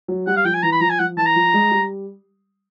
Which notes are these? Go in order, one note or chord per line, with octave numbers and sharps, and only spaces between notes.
F#3
G3 F#5
F5
F3 G5
G#5
E3 A#5
B5
F3 A#5
G#5
F3 F#5
E3 A5
A#5
F3
G#3
G3